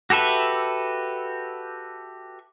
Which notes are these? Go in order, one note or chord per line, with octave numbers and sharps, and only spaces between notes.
F#4 G4 A4 B4 E5